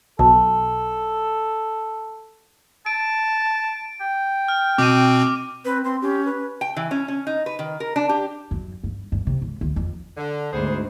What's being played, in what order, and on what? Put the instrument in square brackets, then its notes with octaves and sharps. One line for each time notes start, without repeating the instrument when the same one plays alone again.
[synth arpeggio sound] B1 [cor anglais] A4 [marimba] A5
[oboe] A5 [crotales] D7
[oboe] G5
[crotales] F6
[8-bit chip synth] B2 C4 [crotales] D6 D#7
[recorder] C4 [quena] B4
[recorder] C4 [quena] C6
[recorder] C#4 [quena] G4
[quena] B4
[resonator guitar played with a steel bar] G5
E3
C#4
C#4
D#4
B4
D#3
A#4
D4
G4
[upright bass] F#2
G2
G2
C3
G#2
D2
F2
[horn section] D3
[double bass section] D2 G#2 [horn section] B3 G#4 C5